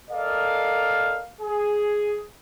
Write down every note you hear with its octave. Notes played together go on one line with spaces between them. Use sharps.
A4 A#4 D5 D#5 F5
G#4